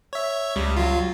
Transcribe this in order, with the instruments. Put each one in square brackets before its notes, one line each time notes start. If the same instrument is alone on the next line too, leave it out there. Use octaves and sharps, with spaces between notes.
[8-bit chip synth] C#5 E5
[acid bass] C#2 [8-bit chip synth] G3
[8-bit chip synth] F#3 F4